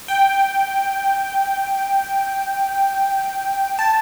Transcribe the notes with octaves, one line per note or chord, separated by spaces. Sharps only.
G5
A5